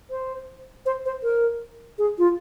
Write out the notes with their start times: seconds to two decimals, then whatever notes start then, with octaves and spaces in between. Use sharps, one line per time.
0.11 C5
0.86 C5
1.06 C5
1.23 A#4
1.98 G#4
2.19 F4